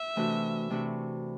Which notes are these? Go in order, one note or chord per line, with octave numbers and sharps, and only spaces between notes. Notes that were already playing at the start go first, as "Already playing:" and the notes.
Already playing: E5
C3 E3 A3 D4 F#4
C3 E3 A3 D4 F#4